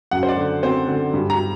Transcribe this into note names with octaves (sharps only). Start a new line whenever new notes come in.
F#2 F#5
C5
D5
D3
C4 C5
D3
G2
A#5